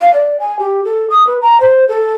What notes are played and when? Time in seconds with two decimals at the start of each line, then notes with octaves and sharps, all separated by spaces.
0.01 F5
0.14 D5
0.40 G#5
0.59 G4
0.84 A4
1.10 D#6
1.27 B4
1.41 A#5
1.60 C5
1.88 A4